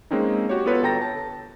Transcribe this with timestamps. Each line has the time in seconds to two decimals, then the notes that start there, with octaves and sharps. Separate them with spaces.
0.11 G#3 A#3 C4 C#4 D#4
0.49 F#4 G4 C#5
0.66 B3 F4 A4 B4 C#5
0.82 G1 A4 G5 A#5 A#6
1.01 A5